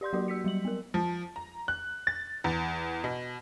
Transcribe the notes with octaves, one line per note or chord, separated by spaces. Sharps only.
G4 D5 C6 G6
F#3 A#3 F#4 G4
E6 B6 C#7
F#3 G3 F#7
B3 A#4
F3
A#5
F#6
A6
E2
B2